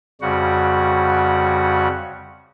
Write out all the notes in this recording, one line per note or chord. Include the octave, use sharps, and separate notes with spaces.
F2 C#3 G3 F#4 F#5